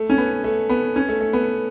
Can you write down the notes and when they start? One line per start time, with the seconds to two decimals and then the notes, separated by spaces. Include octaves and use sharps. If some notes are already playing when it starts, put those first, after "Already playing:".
Already playing: A3
0.09 C#4
0.18 B3
0.44 A3
0.69 B3
0.96 C#4
1.09 A3
1.20 A3
1.33 B3